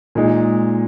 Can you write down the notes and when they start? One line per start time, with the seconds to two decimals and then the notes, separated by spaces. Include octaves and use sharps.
0.15 A#2 G#3 D#4